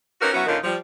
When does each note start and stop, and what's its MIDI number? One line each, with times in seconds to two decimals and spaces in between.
0.21 0.32 61
0.21 0.32 63
0.21 0.32 66
0.21 0.32 70
0.21 0.32 71
0.21 0.32 73
0.33 0.45 54
0.33 0.45 59
0.33 0.45 61
0.33 0.45 64
0.33 0.45 66
0.46 0.58 46
0.46 0.58 50
0.46 0.58 51
0.46 0.58 61
0.46 0.58 63
0.46 0.58 65
0.64 0.75 53
0.64 0.75 55